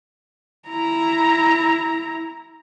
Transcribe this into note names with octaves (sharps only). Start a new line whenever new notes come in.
E4 A#5